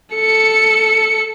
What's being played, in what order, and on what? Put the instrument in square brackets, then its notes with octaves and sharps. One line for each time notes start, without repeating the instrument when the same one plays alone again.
[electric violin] A4 C#7